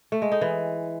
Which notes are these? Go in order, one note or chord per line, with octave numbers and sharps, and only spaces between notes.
A3
G#3
D#4
E3